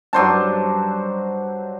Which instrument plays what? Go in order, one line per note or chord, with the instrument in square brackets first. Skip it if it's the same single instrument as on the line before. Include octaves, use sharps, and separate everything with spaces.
[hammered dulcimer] G2 F#3 C5 A5